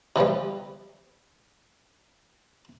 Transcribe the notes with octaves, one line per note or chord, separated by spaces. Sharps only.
B2 E3 F3 G3